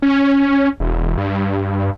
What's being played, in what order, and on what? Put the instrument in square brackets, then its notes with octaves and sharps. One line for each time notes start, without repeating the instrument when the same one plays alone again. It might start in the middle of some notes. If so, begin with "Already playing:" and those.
[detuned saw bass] C#4
E1
G2